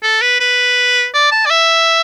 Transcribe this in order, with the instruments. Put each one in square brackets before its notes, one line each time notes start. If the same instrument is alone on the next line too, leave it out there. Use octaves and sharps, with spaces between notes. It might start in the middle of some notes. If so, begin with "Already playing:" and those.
[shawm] A4
B4
B4
D5
A5
D5
E5